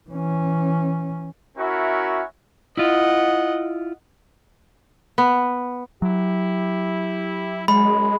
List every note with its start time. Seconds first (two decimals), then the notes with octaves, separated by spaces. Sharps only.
0.10 E3 C#4
1.56 C#4 E4 F#4 A#4 E5
2.77 E4 F4 D#5 F#5
5.18 B3
6.02 F#3 E4 G4
7.68 F#2 G#3 B5